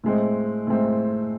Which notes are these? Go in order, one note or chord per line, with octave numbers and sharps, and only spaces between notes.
A2 G#3 C4
A2 G#3 C4